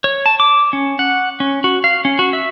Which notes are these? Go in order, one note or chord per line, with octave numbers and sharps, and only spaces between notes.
C#5
A5
D6
C#4
F#5
C#4
F#4
F5
C#4
F#4
E5